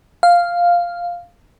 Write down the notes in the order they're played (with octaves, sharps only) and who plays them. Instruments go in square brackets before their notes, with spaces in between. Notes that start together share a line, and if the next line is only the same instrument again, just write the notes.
[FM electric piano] F5